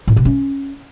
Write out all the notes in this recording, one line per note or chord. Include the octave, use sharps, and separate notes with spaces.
A2
C3
C#4